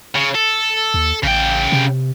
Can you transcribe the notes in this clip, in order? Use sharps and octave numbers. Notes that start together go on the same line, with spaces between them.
C#3
A4
D#2
A1 C#3 G5
C3